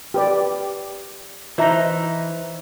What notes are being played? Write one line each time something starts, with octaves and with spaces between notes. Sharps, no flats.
G4 B4 D5
E3 D#4 C5 E5 A#5